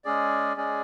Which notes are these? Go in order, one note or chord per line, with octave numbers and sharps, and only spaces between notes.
G#3 C#4 G#4 D5
G#3 C#4 G#4 D5